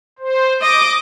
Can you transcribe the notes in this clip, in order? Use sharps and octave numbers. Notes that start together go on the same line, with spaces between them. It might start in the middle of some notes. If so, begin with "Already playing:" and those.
C5
D#5 D6